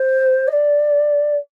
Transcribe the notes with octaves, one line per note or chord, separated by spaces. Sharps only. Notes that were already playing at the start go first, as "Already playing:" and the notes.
Already playing: C5
D#5
D5